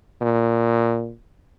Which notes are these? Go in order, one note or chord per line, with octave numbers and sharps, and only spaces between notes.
A#2